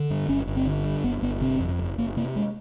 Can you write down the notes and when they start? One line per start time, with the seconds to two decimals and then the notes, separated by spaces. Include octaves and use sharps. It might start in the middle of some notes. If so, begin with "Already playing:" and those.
Already playing: D3
0.10 G2
0.28 G1 C#4
0.47 G1
0.57 C4
0.66 D3
0.84 G2
1.04 G1 B3
1.22 G1 B3
1.41 C3 C4
1.60 F2
1.79 F#1
1.98 F#1 A#3
2.17 C3 A#3
2.36 G#3